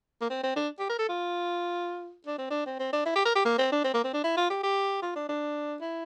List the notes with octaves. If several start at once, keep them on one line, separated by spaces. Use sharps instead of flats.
A#3
C4
C4
D4
G4
A#4
A4
F4
D4
C4
D4
C4
C4
D4
E4
G4
A#4
G4
A#3
C4
D4
C4
A#3
C4
D4
E4
F4
G4
G4
F4
D4
D4
E4